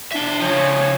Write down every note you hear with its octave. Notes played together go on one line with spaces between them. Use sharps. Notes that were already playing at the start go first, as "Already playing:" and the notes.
D4 E5 G5
C#3 F3 C#5